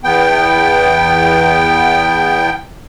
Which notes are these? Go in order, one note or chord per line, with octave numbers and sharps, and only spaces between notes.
E2 B3 G5